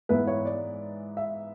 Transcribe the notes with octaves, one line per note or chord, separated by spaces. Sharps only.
G#2 E3 B3 E4 B4
C#5
D5
E5